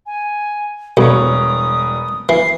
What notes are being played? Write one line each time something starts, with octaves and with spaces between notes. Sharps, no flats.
G#5
E1 B1 G2 C#5 D#6
E3 C7